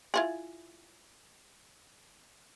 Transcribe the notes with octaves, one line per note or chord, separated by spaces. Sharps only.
E4 F4 G#4